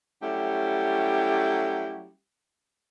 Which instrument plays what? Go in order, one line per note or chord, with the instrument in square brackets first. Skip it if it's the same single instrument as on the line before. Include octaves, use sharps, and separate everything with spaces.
[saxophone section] F#3 G3 A3 C#4 E4 G4